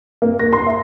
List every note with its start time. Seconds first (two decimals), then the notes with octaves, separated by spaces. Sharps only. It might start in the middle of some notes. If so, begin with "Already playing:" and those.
0.22 A#3
0.39 A#6
0.53 C6
0.67 E5